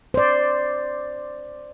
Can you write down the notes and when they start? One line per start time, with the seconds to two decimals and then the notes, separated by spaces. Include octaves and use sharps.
0.14 C5 D5